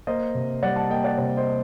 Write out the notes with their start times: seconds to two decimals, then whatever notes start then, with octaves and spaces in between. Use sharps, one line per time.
0.07 A#3 C5 D#5
0.35 C3
0.63 G3 D5 F#5
0.76 F#5 A5
0.90 A#3 D#5 G5
1.04 D5 F#5
1.18 C3 D5
1.37 C5 D#5